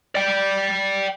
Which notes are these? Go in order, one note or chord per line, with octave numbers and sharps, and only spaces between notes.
D5 G5